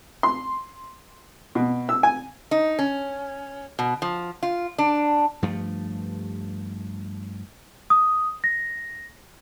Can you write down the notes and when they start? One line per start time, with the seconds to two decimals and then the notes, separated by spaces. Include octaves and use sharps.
0.23 C6
1.55 B2
1.89 E6
2.03 G#5
2.51 D#4
2.79 C#4
3.79 B2
4.02 F3
4.43 F4
4.78 D4
5.42 G2 F3 A3
7.90 D#6
8.44 A#6